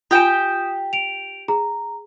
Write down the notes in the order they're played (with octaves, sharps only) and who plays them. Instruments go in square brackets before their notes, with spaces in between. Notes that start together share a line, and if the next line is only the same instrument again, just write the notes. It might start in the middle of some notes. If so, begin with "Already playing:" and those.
[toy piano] F4 G#5 [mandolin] G4 G5 [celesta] D#6 E7
[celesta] D7 F7
[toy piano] G#4 [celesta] A#5